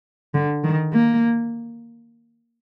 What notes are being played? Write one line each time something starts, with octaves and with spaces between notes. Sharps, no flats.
D3
D#3
A#3